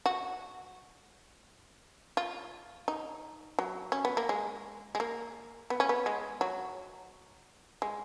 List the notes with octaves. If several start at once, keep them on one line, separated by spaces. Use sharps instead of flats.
F#4
F4
D#4
F#3
C#4
B3
A#3
G#3
G#3
A#3
B3
C#4
B3
G#3
F#3
G#3